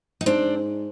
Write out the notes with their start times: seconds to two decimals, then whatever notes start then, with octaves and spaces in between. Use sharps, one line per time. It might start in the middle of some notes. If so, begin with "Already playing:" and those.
0.21 D#4
0.26 G#2 C4 D4